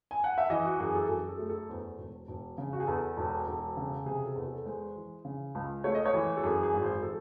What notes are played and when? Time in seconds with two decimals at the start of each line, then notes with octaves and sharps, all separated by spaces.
0.11 G#5
0.24 F#5
0.38 E5
0.50 E3 D#5
0.65 F#4
0.79 F#2 G#4
0.95 A4
1.09 F#2 A4
1.29 A4
1.39 A3
1.49 A4
1.69 E2 C5
1.98 E1
2.28 E1
2.58 C#3
2.73 F#4
2.80 G#4
2.87 E2 A4
3.17 E1
3.47 E1
3.77 C#3
4.06 C3 G#4
4.26 A4
4.36 E2
4.46 A4
4.66 G#3 C5
4.96 E3
5.25 C#3
5.55 C#2
5.84 A3 C#5
5.95 D#5
6.06 C#5
6.14 E3
6.37 A4
6.43 F#2 G#4
6.63 G#4
6.73 G#1
6.83 C5
7.03 E3 A4